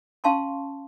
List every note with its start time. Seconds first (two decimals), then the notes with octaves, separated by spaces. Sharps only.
0.24 C#4 F5 A5 C6 C#6